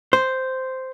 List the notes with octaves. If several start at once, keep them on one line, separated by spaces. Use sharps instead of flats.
C5